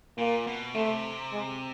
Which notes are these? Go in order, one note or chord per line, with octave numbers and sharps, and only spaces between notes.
A#2 A#3
B2
C3 A3
G#3